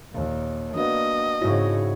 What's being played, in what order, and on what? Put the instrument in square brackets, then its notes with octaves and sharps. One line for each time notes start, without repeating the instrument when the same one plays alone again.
[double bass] D#2 A#2
[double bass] A#3 B3 [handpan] D4 F#4 [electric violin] D#5
[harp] G#2 A#6 [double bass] C#3 C4 [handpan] E4 F#4 C#5